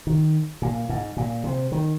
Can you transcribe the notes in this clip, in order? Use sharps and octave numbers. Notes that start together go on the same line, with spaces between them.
D#3
A#2
G#2
A#2
C3
D#3